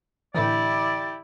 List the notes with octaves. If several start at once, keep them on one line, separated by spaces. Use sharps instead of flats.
A2 D3 E3 E4 G4 D5